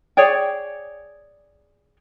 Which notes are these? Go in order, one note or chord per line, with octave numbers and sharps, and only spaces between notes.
G#4 C#5 D5 G5